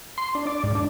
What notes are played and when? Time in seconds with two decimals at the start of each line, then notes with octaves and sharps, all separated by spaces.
0.18 C6
0.35 D4
0.47 D5
0.63 G#2
0.75 D4